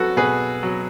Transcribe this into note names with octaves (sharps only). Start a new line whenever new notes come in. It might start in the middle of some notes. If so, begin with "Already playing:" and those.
Already playing: F#3 F#4 A4 B4
B2 G#4 B4
F#3